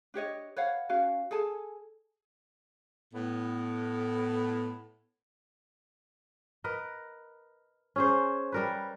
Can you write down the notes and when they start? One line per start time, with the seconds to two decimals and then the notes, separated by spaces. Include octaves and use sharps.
0.14 D4 G4 C#5 D#5
0.56 B4 C#5 F5 F#5
0.89 C#4 F#4 F5 G#5
1.31 G#4 A4 G#5 A5
3.14 A2 B3
6.64 A#4 B4 D#5
7.96 C#4 G#4 C5
8.52 G3 A#4 B4